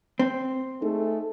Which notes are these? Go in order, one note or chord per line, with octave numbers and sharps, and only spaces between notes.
C4
A3 D#4 G#4 A4